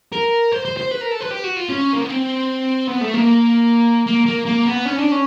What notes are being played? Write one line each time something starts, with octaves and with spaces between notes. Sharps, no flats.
A#4
C5
C5
C5
B4
A#4
A4
B4
G4
F#4
F4
C#4
A#3
B3
C4
B3
A3
A#3
A#3
A#3
A#3
B3
C#4
D4
C#4